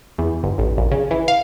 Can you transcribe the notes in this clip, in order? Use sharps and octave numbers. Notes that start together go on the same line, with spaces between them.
E2
G1
A1
A#1
C#3
E3
F5